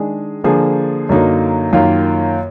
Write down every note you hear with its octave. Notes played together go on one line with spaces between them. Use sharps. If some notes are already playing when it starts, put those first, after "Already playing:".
Already playing: D#3 G#3 D4 G#4
D3 F3 A#3 D4 G#4
F#2 D3 F#3 A#3 D#4
F#2 D#3 A#3 F4